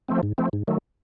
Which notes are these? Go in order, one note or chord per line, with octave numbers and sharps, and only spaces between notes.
F3 A3 C4
G#2
F3 A3 C4
G#2
D#3 F#3 A3